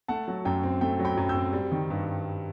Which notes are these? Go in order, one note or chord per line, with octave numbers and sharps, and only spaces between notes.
A3 F#5 A5
F#3
F#2 G5
C4
A3 G5
F#3
G5 B5
F#2
E6 G6
C4
G3
D#3
G2